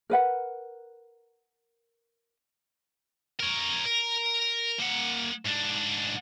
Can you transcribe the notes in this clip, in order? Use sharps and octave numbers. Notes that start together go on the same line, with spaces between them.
A#4 B4 F#5
A#4 C#5
A#4
A#3 F#5
G#2 D4